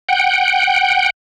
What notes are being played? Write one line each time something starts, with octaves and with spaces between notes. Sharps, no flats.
F#5 G5